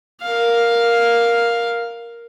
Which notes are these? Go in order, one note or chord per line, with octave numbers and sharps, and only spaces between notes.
A#4 F5